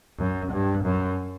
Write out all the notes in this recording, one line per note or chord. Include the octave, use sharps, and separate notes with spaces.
F#2
G2
F#2